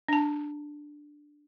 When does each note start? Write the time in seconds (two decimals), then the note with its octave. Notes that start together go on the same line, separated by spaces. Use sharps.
0.08 D4 A5